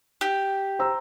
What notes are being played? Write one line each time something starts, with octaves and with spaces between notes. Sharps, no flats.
G4
C5 A#5 E6